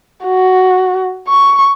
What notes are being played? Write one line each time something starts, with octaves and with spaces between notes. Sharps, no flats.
F#4
C#6